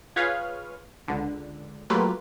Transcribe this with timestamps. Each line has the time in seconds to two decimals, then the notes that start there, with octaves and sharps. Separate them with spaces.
0.16 F4 G#4 B4 C#5 F5
1.08 C#2 D3
1.90 F#3 A3 A#3 F4 G4 B4